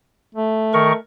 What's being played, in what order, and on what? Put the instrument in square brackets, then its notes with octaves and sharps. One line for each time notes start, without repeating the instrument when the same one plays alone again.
[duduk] A3
[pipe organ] D#3 A#4 C#6